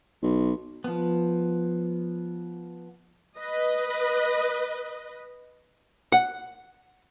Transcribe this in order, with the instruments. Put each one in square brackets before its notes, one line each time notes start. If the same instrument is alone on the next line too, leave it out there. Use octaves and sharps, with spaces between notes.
[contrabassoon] B1
[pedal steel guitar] F3 B3
[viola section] B4 D#5
[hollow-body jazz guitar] F#5